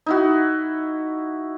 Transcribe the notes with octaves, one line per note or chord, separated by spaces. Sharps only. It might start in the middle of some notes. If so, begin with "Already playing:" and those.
D#4 E4 F#4